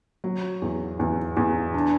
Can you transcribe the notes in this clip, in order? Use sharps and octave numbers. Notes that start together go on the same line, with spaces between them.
F#3
E2
E2
E2
D4